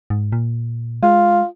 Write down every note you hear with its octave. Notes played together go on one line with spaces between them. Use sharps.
G#2
A#2
G#3 F4